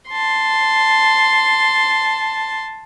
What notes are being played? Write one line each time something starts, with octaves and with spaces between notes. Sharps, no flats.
A5 C6